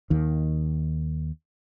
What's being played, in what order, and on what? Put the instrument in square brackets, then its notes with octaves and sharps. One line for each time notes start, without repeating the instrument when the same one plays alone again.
[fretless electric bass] D#2 D#3